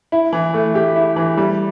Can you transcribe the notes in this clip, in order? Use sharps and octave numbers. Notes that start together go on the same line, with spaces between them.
E4
E3
A3
G4
E4
E3
G3